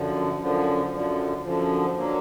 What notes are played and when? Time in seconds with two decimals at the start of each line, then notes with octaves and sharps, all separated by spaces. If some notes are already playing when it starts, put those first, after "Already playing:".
Already playing: F#2 D3 F3
0.40 F#2 D3 F3
0.92 F#2 D3 F3
1.45 F#2 D3 F3
1.97 D3 F#3 A#3